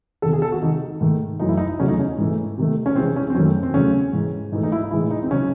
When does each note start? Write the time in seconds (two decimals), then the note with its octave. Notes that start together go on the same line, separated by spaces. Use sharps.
0.22 E2 C3 D#3 A4
0.33 G#4
0.42 A4
0.52 F#4
0.62 C3 D#3 G#3 D#4
1.01 G#2 D#3 A3
1.39 F#2 E3 A3 D#4
1.49 E4
1.57 D#4
1.79 E2 C#3 F#3 A3 C#4
1.88 D#4
1.99 C#4
2.18 G#2 E3 A3
2.58 C3 D#3 A3
2.86 C#4
2.96 C3 E3 G#3 C4
3.16 C#4
3.30 C4
3.35 F#2 D#3 A3 C#4
3.63 C4
3.74 E2 C#3 F#3 A3 C#4
4.13 G#2 E3 G#3
4.52 G#2 E3 A3 D#4
4.63 D#4
4.72 E4
4.91 A2 E3 G#3 E4
5.11 D#4
5.22 C4
5.31 C#3 F#3 C#4